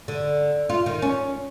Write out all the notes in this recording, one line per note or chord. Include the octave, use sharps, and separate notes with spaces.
D3
F4
D#3
C#4